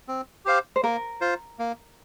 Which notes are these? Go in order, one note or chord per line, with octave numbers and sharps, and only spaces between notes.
C4
G4 C5 F5
C5
A#3 A#4
F4 C5
A#3